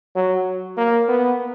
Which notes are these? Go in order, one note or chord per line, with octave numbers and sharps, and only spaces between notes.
F#3
A#3
B3